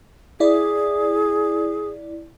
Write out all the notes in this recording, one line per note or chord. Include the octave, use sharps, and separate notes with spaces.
E4 G#4 D5